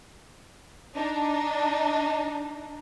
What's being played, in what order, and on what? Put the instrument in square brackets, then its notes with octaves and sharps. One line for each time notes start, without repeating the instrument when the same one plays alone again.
[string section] D4 D#4